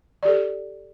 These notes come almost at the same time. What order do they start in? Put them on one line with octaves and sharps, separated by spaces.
D5 G4 A4